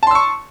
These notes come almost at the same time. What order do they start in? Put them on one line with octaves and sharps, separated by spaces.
A5 C6 E6 C#6